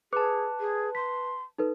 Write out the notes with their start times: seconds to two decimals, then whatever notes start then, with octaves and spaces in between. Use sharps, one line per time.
0.13 G#4 B4 A5 D6
0.60 G#4
0.95 C6 B6
1.58 D#4 A4 B4